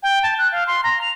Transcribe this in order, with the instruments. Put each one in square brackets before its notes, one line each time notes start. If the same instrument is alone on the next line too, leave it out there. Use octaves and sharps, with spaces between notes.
[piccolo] G5
A5
F#6
F5
C6
A#5
F7